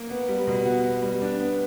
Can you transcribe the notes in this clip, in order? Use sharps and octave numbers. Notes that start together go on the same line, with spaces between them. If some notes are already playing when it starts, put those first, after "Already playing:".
Already playing: A#3
B3
G3
B2
F#4
B3
G3
D4
B3